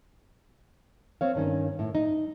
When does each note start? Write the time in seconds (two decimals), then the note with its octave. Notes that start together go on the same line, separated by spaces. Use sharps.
1.21 C4 C#5 F5
1.35 G2 D#3 C#4
1.79 A2
1.95 D#4